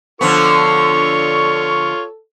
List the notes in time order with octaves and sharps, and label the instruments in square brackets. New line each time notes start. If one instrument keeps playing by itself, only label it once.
[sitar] D3 F3 B3 [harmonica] F4 C#5 [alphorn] A4 [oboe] C#6